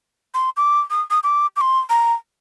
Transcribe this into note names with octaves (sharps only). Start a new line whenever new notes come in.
C6
D6
D#6
D#6
D6
D6
C6
A#5